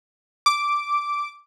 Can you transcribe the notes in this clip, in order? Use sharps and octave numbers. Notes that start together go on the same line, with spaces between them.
D6